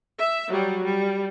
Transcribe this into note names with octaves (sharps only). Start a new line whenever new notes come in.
E5
F#3 G3
G3